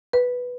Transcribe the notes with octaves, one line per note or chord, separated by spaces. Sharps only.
B4